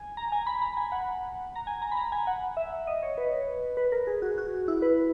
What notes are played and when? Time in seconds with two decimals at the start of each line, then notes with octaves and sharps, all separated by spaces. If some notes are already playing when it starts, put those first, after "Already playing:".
Already playing: G#5
0.17 A#5
0.32 G#5
0.47 B5
0.62 A#5
0.77 G#5
0.92 F#5
1.56 A#5
1.67 G#5
1.82 A#5
1.91 B5
1.97 A#5
2.12 G#5
2.27 F#5
2.57 E5
2.87 D#5
3.02 C#5
3.18 B4
3.77 B4
3.92 A#4
4.07 G#4
4.22 F#4
4.38 F#4
4.68 E4
4.82 B4